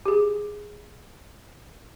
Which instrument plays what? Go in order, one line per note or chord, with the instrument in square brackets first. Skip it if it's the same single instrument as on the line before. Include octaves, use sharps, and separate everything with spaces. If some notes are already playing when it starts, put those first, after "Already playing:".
[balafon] G4 G#4